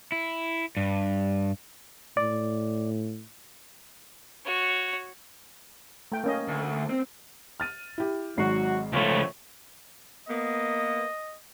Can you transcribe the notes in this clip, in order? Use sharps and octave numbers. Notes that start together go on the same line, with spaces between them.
E4
G2
A2 D5
F#4 C#5
A3 G5
A#3 C#4 D#5
D2
C4
F6 A6 D#7
E4 G4
G#1 G#2 F#3 F#4 C7
C#2 F3 A3 C#5
A#3 B3 D#5